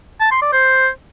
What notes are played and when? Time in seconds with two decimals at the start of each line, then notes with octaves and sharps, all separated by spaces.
0.21 A5
0.31 C6
0.42 D5
0.53 C5